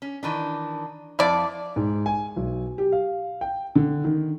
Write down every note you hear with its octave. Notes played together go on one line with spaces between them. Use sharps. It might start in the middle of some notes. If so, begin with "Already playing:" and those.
C#4
D#3 E3 D4
F2 F3 E4 D5 F5
G#2
G#5
B1
G4
F5
G5
D3
D#3